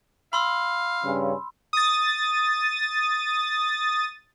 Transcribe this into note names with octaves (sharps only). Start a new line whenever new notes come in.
F5 B5 C6 E6
G2 C#3 C#4
D#6 A6